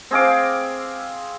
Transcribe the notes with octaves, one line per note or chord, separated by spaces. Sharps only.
C4 G#4 F5 D6